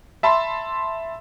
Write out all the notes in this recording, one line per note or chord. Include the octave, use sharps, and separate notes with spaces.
E5 A5 B5 C6